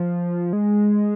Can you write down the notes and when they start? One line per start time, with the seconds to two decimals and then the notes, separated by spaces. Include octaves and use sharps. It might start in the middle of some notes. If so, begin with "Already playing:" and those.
Already playing: F3
0.53 G#3